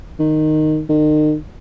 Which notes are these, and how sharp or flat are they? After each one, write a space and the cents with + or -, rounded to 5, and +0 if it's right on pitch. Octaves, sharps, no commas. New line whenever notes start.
D#3 -10
D#3 -35